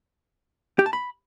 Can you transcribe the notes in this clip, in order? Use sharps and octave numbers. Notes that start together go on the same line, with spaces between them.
G4
A5
B5